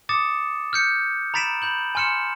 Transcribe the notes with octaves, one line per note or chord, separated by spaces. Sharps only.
D6 D#6 A6 C#7 E7
F6 G6 C#7
A#5 B5 A6 B6 D7 E7
B5 G6 F#7
G#5 C6 F6 C#7 E7